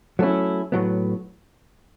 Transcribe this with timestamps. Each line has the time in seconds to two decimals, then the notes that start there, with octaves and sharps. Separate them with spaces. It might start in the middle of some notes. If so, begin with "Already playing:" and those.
0.19 F#3 A3 C#4 E4
0.72 A2 F#3 B3